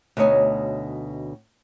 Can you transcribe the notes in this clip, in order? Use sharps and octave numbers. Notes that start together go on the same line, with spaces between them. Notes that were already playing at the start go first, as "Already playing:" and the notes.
D2 B2 D#4 C#5 D#5 G#5